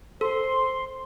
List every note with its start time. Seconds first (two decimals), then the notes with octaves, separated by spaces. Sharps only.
0.21 A4 C5 C6